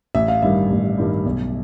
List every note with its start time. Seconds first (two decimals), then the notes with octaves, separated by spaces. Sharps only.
0.15 A1 E5
0.28 F5
0.42 G2 D#3 G3 E5
0.70 A1
0.98 G2 D#3 G3
1.26 B1